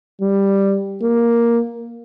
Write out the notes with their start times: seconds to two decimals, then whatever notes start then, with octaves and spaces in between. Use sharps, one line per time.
0.21 G3
1.02 A#3